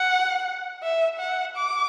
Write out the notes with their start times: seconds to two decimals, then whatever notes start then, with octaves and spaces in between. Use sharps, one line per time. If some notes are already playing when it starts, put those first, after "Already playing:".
Already playing: F#5
0.83 E5
1.20 F#5
1.56 D6